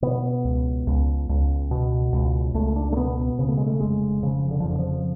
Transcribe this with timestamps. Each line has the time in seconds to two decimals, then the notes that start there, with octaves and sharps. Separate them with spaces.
0.02 B2 B3
0.45 C#2
0.87 C#2
1.29 C#2
1.71 B2
2.13 C#2
2.54 C#2 A3
2.76 D4
2.92 A3
2.97 B2 B3
3.39 C#3 B3
3.48 A3
3.57 G#3
3.66 A3
3.80 F1 G#3
4.23 C#3 F3
4.51 D3
4.60 F3
4.64 F2
4.69 D3
4.79 F3